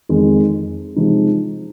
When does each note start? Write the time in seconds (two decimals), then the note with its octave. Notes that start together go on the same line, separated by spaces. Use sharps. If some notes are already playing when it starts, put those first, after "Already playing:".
0.09 F2 D#3 G#3
0.96 C3 F3 G#3 D#4